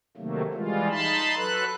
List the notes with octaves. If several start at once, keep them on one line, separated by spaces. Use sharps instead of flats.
C3 D#3 F#3 A3 A#3
E3 G3 G#3 F4
D#4 A5 B5 C6
F#3 A4 B4 F#6